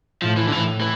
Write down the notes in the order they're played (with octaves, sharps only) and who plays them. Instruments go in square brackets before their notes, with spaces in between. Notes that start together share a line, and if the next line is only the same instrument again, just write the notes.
[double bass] A2 [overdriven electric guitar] F3
[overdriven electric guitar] E3
D3
[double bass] A2 [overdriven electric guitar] E3
[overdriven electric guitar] E3